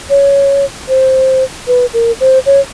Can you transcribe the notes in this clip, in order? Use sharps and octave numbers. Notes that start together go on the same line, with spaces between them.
C#5
C5
B4
A#4
C5
C#5